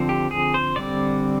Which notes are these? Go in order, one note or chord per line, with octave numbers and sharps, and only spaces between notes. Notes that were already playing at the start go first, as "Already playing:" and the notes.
Already playing: D3 F3 C4
G4
G#4
C5
D3 G3 C4 D5